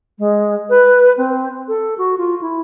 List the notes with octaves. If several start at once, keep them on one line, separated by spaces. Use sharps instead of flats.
G#3
B4
C4
A4
F#4
F4
E4